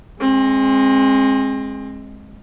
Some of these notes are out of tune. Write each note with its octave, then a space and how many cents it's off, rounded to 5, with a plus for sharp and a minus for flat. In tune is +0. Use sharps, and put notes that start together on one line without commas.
G#3 +0 C4 +30